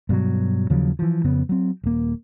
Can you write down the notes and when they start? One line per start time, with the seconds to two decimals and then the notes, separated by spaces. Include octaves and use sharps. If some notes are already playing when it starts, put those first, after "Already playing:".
0.09 G2 B2 F#3
0.70 D#2 C#3 F3 F#3
0.99 E3 F3
1.24 F2 C#3 B3
1.49 F#3 C4
1.84 D#1 A#3